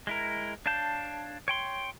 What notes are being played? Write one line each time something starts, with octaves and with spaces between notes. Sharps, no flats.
G#3 E4 A#4
D4 C#5 F5 A5 G6
C#5 G5 C6